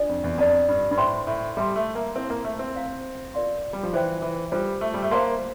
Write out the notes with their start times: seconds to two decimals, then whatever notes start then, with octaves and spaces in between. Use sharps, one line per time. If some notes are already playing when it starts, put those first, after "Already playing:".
Already playing: D4 F4 A4 D5
0.09 F2
0.24 E2
0.38 F2 A4 D5 A5
0.69 G2
0.91 G2
0.97 A2 C5 G5 C6
1.27 A2
1.57 G3 A4 E5 A5 C6
1.76 A3
1.95 A#3
2.15 C4 E4 A4 C5 F5 A5
2.30 A#3
2.44 A3
2.59 C4
2.75 C5 F5 A#5
3.34 F4 A#4 D5 F5 C6
3.73 G3
3.83 F3
3.93 E3 F4 C5 G5
4.22 E3
4.52 G3 F4 A4 C5
4.81 A3
4.94 G3
5.03 A3
5.11 A#3 C5 F5 A5 C6